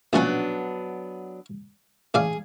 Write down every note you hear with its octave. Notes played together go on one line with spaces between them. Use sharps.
A#1 B2 F#3 B3 C#4 D4
A1 G#4 D5 F5